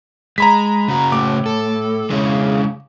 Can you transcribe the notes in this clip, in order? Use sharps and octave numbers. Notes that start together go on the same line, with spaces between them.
G#3 A#5 B5 B6
C#3 F#4
A2 D6
A4
C#3 G#3 E4